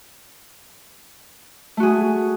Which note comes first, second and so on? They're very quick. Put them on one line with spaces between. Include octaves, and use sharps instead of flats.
A3 F#4 G#4